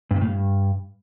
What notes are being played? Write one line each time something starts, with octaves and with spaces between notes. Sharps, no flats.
G2
C3
A2
G2